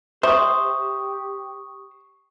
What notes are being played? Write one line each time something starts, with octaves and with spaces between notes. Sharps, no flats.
G4 C5 E5 C#6 D#6